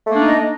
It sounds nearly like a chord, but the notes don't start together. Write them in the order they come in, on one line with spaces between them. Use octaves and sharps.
A3 A#3 D4 D#4 D#5